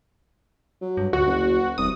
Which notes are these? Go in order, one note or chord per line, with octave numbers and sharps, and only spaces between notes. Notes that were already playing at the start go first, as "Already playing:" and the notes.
F#3
G2
D2 F#4
F#1
E1 C2 D#6